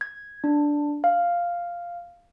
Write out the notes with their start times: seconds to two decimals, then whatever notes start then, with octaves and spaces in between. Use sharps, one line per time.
0.01 G#6
0.44 D4
1.04 F5